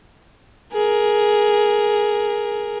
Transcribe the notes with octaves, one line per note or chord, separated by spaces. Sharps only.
G#4 A#4